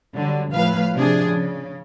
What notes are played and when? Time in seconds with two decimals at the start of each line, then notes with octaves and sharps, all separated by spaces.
0.15 D3 F#3 G3
0.53 A2 F3 B4 F5
0.96 C3 F3 D4 G#4
1.31 C#3